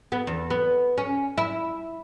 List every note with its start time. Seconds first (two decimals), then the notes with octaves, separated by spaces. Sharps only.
0.12 B3
0.27 E2
0.50 B3
0.98 C#4
1.38 E4